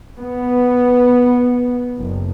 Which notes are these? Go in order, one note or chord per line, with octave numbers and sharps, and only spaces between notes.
B3
F#1